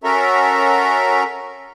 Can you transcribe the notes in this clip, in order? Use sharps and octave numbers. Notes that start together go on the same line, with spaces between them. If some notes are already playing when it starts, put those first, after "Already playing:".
C#4 F#4 A4 A#4 E5 A#5